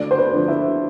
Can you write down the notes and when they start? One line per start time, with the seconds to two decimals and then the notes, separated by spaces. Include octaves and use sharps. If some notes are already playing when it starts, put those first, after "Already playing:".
Already playing: D2 D5
0.11 C5
0.18 B4
0.33 D3 F3
0.48 E4